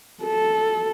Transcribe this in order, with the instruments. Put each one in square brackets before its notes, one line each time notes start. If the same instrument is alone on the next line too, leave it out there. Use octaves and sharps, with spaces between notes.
[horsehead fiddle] A4